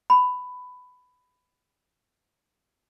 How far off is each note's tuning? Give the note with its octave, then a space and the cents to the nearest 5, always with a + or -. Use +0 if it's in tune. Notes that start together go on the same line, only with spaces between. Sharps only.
B5 +15